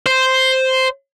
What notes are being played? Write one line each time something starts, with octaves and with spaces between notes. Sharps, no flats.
C5